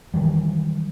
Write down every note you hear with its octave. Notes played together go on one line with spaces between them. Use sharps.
D#3 E3 F#3 G3